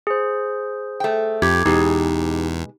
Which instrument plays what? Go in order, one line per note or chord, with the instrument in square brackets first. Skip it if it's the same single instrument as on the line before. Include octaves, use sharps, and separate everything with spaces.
[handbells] G#4 C5
[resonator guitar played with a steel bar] A3 G5
[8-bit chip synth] F2 [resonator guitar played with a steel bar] G4 [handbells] G#6
[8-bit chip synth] E2 [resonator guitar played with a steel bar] B2 G#3 [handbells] D#4 G4